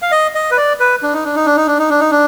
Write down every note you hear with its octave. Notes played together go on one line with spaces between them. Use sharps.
F5
D#5
D#5
B4
D5
B4
D4
D#4
D4
D#4
D4
D#4
D4
D#4
D4
D#4
D4